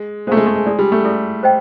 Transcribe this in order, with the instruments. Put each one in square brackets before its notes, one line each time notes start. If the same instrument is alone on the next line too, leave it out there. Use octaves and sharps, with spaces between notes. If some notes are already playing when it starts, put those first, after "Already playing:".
Already playing: [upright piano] G#3
[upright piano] G#3 A3 [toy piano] C5 F5 A#5
[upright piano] G#3
A3
G#3
[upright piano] G#3 [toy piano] E4 A4 D5
[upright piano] G3
A3
[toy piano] E4 A4 D5
C5 D#5 G5